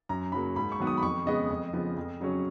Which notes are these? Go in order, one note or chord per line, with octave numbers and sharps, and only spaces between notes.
F#2 A#5
C#3 F#3 A#3 B5
G#2 B5
C#6
D#3 F#3 B3
D#6
B5
F2 C#6
C#3 G#3 B3 D#5
F2
C#3 F3 B3
F2
C#3 F#3 C#4